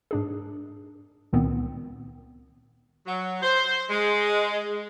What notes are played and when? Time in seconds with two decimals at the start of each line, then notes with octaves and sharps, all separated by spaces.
0.11 G#2 D4 G#4
1.33 C#2 A#2 D#3 B3 C4
3.06 F#3
3.42 C5
3.89 G#3